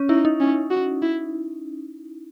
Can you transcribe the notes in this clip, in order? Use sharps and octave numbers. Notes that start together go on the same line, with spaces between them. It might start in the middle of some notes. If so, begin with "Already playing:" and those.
Already playing: C#4
D#4 E4
D#4
C#4
F#4
E4